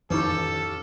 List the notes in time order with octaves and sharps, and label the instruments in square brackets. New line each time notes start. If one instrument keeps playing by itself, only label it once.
[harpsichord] A1 C#4 G4 [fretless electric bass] F2 D#3 [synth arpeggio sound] E3 D#4 [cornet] A4